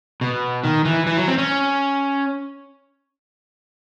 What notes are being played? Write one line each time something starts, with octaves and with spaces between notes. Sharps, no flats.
B2
D#3
E3
E3
F#3
C4
C#4